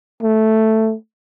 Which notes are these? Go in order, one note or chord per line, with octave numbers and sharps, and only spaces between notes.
A3